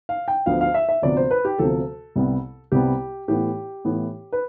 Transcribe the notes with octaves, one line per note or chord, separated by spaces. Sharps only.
F5
G5
D2 D3 F3 B3 F5
F5
E5
E5
D2 C3 F3 B3 D5
C5
B4
G4
D2 C3 F3 B3 A4
C2 C3 G3 B3
C2 C3 G3 B3 G4
A2 E3 B3 G4
A2 E3 B3
B4